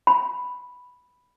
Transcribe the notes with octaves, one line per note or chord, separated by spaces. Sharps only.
B5